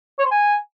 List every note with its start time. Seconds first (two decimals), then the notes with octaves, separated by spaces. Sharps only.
0.19 C#5
0.25 C5
0.31 G#5